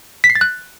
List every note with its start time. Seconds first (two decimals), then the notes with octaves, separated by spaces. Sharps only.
0.24 B6
0.30 C7
0.35 A6
0.41 F#6